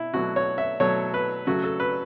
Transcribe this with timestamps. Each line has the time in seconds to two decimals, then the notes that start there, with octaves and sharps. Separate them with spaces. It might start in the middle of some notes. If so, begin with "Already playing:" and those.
Already playing: B2 E4
0.14 B2 F#3 A3 F#4
0.36 C#5
0.58 E5
0.80 B2 F#3 A3 C#5
1.14 B4
1.47 C#3 F#3 A3 F#4
1.64 A4
1.80 B4